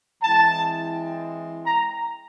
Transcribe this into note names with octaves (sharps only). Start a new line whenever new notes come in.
E3 G#3 C4 E4 A5
A#5